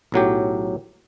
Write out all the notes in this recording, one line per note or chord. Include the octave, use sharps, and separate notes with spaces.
B1 A2 F#3 G4